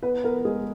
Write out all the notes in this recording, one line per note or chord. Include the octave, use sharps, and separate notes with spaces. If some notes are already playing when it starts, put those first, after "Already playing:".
B3 B4
B3 A#4
G#3 G#4